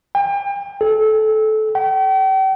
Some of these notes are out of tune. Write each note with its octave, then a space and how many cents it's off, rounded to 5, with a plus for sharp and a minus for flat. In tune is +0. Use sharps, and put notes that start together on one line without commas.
G5 +35
A4 -20
G5 -40